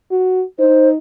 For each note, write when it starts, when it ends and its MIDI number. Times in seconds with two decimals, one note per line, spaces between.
0.11 0.43 66
0.59 0.97 63
0.59 0.89 72